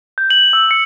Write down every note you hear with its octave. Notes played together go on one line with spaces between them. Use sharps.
G6
F#7
E6
C#7